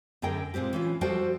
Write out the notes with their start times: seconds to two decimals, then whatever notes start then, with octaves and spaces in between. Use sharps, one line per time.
0.22 F#2 D3 G#4 A#4 G5
0.54 A#2 G#3 C4 G4
0.73 E3 C#4 F4
1.01 F3 G3 F#4 A4 C5 G5